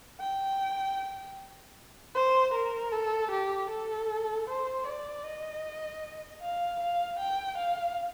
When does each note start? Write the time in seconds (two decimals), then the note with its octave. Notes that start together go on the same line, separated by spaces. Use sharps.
0.21 G5
2.16 C5
2.54 A#4
2.92 A4
3.31 G4
3.70 A4
4.48 C5
4.87 D5
5.25 D#5
6.42 F5
6.80 F5
7.19 G5
7.58 F5